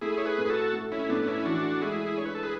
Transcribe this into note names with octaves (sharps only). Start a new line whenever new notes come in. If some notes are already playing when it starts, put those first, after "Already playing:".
A3 E4 G#4
C#5
G#4 B4
A2
B4
F#4 A4
A3
C#4 E4
A2 B3 D4
D4
C#4 E4
E3 D4 F#4
G#3 E4 G#4
D4 C#5
B4
A4
G#4 B4